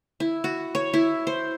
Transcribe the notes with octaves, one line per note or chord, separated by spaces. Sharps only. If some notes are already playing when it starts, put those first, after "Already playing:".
E4
F#4
C#5
E4
C5